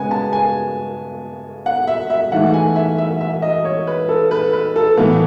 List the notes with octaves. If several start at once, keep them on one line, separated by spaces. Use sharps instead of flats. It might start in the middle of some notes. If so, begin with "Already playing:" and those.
Already playing: C#3 G#3 B3 G#5
A5
G#5
F#5
E5
E5
G#2 E3 A3 F#5
G#5
E5
E5
E5
D#5
C#5
B4
A4
B4
B4
A4
A2 E3 B3 B4